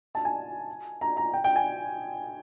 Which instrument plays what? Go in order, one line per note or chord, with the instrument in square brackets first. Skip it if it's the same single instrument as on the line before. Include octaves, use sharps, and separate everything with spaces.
[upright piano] A5
G#5
A#5
A#5
G5
G5
G#5